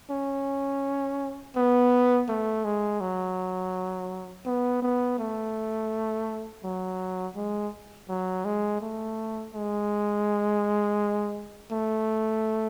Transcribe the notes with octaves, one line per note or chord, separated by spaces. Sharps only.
C#4
B3
A3
G#3
F#3
B3
B3
A3
F#3
G#3
F#3
G#3
A3
G#3
A3